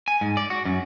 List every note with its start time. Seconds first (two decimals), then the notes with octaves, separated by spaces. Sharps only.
0.08 G#5
0.21 G#2
0.37 D5
0.50 F#4
0.65 F#2